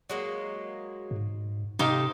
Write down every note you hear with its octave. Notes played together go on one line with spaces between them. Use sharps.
F#3 G#3 A#3
G#2
C3 A3 D#4 G4 C5 F5